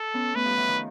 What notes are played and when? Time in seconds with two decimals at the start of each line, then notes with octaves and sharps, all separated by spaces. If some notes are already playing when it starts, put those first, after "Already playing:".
Already playing: A4
0.14 B3 C#4
0.35 A3 B3 B4
0.45 F3 G3
0.57 E3 F#3
0.68 D#3 F3